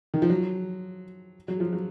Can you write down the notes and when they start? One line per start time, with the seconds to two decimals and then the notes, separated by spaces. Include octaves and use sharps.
0.14 D#3
0.22 F3
0.30 F#3
1.48 F#3
1.60 F3
1.73 F#3